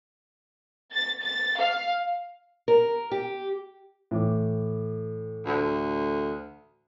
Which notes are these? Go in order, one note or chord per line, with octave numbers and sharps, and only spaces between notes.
A6
A6
F5
A#4
G4
A2 E3 D6
D2